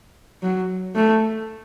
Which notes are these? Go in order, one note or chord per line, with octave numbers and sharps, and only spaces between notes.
F#3
A3